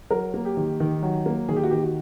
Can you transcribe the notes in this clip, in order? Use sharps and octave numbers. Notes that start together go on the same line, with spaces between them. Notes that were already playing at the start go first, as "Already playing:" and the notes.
F#3 A#4
A#3
G4
D#3
D#3
F#3
A#3
D#3 G#4
G4
F#4
D#3 G4
F#4